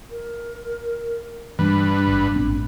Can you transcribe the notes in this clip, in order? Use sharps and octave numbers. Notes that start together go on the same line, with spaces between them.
A#4
G2 E3 G3 D4 B4
G#1
A1 C4